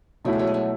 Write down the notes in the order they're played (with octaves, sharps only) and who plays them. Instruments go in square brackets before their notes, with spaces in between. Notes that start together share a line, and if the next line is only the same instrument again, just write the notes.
[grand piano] B2 A3 E4 [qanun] F#3
[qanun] G#3
F#3
G#3
F#3